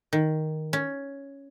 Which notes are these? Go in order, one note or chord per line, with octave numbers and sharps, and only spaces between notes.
D#3
C#4